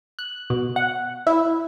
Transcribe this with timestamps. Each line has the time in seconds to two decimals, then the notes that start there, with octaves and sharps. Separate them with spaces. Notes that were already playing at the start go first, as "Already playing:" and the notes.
0.19 F#6
0.50 B2
0.76 F#5
1.27 E4